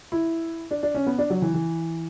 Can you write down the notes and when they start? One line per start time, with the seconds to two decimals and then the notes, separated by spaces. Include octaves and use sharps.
0.12 E4
0.71 D4
0.83 D4
0.95 C#4
1.06 B3
1.18 D4
1.30 F#3
1.42 E3
1.54 E3